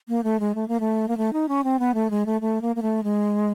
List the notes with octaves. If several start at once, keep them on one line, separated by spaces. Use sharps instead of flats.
A#3
A3
G#3
A3
A#3
A3
A#3
A3
D#4
C#4
C4
B3
A3
G#3
A3
A3
A#3
A#3
A3
G#3